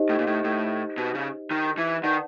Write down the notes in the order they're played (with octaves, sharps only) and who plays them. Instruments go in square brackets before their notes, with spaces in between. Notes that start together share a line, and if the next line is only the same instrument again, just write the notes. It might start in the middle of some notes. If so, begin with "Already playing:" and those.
Already playing: [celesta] D#4 G4 C5 D#5
[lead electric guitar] A2
A#2
A2
A2
B2
C#3
D#3
E3
[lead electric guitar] D#3 [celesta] B4 D5 F#5 A5